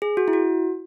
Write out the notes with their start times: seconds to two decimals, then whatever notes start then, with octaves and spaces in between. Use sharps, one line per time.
0.02 G#4
0.17 F#4
0.28 E4
0.33 F#4